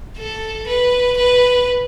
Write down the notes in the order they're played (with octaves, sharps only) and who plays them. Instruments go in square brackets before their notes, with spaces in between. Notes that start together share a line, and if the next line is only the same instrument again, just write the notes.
[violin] A4
B4
B4